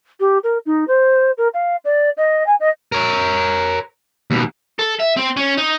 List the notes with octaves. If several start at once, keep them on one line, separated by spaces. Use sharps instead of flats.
G4
A#4
D#4
C5
A#4
F5
D5
D#5
G#5
D#5
A#4 C#5
D#2 B2
A4
E5
C4
C#4
D#4